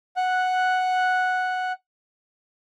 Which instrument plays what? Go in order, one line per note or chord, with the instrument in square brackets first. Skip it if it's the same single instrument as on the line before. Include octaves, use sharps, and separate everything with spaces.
[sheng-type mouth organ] F#5 F#6